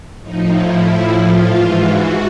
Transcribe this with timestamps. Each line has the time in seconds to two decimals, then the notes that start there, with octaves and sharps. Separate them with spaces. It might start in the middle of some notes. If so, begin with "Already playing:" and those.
0.22 A2 F3 D#4
0.53 E4
0.83 A2 F3
1.13 F4
1.43 G#2 E3
1.74 F#4